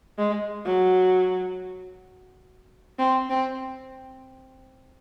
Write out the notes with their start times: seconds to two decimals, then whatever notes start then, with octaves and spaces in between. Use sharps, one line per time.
0.18 G#3
0.65 F#3
2.99 C4
3.30 C4